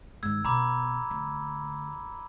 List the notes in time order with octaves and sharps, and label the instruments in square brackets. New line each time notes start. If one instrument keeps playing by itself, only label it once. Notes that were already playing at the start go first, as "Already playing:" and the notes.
[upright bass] G#2 D#3 [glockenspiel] E6 G#6
[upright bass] B2 [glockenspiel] A#5 B5 D6
[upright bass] D2